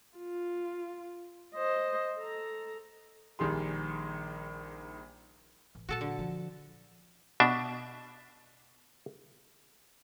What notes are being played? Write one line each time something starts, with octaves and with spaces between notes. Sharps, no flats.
F4
C5 D#5
A4 A#5
A#1 D#3 G3 G#4 C6
A1
A#2 F#3 F#4 A4 A5
D3
F3
B2 D4 E5